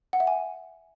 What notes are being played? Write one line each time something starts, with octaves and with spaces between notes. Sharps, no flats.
F#5
E5
G#5